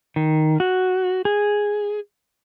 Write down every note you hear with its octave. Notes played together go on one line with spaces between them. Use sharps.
D#3
F#4
G#4